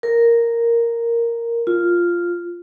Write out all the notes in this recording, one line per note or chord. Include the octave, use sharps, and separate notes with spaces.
A#4
F4